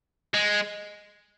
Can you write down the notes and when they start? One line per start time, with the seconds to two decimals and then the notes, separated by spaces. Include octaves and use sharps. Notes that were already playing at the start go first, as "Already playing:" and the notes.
0.34 G#3